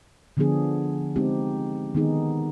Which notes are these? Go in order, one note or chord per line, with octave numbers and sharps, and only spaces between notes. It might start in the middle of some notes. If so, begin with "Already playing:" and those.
D3 F3 B3 D4 G#4
G#3 C4 D#4 G4
D#3 B3 D#4 G#4